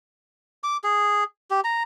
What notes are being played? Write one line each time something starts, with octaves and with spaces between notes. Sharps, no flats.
D6
G#4
G4
A#5